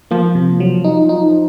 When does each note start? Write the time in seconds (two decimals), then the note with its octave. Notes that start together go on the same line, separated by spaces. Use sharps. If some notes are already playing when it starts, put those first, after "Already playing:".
0.11 F3 A#3
0.35 C3
0.60 F#3
0.84 D#4
1.09 D#4